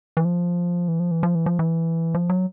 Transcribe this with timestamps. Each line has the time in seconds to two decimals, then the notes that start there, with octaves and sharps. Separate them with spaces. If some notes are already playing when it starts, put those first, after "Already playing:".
0.17 E3
0.24 F3
0.88 E3
1.00 F3
1.11 E3
1.23 F3
1.35 E3
1.46 F3
1.59 E3
2.14 F3
2.29 F#3